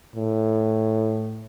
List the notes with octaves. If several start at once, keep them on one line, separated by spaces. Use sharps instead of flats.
A2